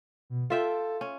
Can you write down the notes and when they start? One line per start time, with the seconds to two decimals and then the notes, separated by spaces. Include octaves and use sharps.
0.30 B2
0.50 F4 A4 E5 G5
1.01 C#4